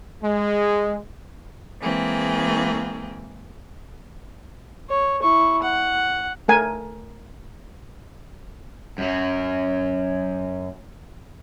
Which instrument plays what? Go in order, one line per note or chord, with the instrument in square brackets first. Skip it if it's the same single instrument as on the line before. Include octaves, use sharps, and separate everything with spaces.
[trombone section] G#3
[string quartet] E3 G#3 A#3 C4 G#4
[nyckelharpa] C#5
E4 C#6
F#5
[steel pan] A3 A#4 G#5
[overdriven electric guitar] F#2 F#3